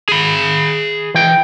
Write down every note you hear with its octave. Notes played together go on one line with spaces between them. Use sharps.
G#4 B5
E3 G5